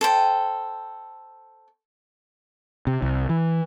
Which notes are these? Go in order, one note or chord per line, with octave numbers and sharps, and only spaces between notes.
A4 C5 G5
C3
C2
E3